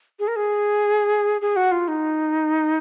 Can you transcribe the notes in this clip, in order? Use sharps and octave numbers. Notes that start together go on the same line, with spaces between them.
G#4
A#4
G#4
G#4
F#4
F4
D#4